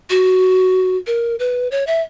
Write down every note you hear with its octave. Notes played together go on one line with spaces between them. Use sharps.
F#4
A#4
B4
C#5
E5